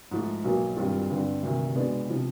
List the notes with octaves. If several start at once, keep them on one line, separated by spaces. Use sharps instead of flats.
G#2 F3 A3
B1 B2 F#3 A#3
G2 D#3 G3 C4 F4
G2 D3 G3 C4
D2 C3 D#3
B2 G#3 B3 D4
C3 F3